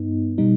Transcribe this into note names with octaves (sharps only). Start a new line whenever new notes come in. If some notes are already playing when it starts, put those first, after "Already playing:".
Already playing: G2 B3 D#4
B2 G3 D#4